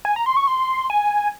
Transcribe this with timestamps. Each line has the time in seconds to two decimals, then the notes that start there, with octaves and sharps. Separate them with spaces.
0.05 G#5
0.16 A#5
0.26 C6
0.37 C#6
0.47 C6
0.90 G#5